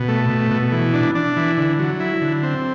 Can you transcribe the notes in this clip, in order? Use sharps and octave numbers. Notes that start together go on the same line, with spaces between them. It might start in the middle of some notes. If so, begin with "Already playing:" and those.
Already playing: B2
A3
B2
B2
E3
D4
D4
E3
D3
F#3
E4
D3
C4